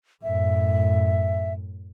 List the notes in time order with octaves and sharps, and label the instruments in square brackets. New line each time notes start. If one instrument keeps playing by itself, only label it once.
[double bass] F#2 A2 [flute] E5